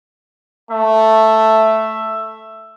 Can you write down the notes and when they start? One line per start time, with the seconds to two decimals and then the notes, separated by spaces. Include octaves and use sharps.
0.71 A3 E5